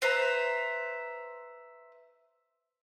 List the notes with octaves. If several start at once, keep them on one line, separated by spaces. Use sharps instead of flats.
B4 C5 E5 A#5